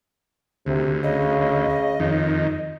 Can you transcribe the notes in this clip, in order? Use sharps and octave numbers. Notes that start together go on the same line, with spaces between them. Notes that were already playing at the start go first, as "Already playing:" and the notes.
D2 C3
C#3 D#5
F2 D#3